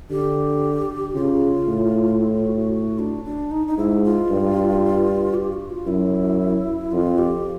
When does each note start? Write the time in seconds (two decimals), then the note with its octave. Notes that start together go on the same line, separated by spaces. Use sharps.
0.10 D3 G4
1.15 C#3 F4
1.68 A2
2.20 E4
2.33 F4
2.47 F#4
2.59 F#4
2.72 F#4
2.99 D4
3.25 D4
3.51 D#4
3.68 D#4
3.78 G#2 E4
4.04 F4
4.30 G2
5.34 G4
5.53 F#4
5.70 F4
5.86 F#2 E4
6.92 F2 F4
7.18 G4